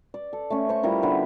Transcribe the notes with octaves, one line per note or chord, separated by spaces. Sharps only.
D5
A4
A3 C#4
C5 C#6
G3 E4 F4 A#4
D3 B3 B4